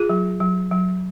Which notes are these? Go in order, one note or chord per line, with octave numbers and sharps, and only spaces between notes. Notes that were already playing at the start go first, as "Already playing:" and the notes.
Already playing: F4 G#4
F#3
F#3
F#3